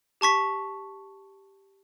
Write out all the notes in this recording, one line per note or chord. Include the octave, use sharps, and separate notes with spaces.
G4 A5 C#6 B6